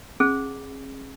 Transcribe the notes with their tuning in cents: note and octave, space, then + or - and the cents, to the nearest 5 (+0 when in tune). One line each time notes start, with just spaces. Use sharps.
C#4 -45 G#4 +0